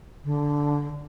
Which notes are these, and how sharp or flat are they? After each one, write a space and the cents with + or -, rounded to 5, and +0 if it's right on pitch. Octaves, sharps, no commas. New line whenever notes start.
D3 -10